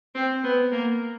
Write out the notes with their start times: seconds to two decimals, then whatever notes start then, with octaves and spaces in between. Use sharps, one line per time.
0.15 C4
0.44 B3
0.72 A#3